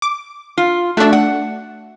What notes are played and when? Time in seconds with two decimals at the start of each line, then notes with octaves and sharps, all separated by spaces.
0.02 D6
0.58 F4
0.97 A3 D4 F#4 E5
1.13 F#5